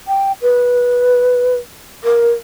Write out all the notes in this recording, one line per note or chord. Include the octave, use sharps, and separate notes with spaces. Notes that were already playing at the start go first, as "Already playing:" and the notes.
G5
B4
A#4